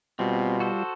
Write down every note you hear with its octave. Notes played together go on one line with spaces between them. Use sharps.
B2 G3 C4 F4
F#4 A4 C5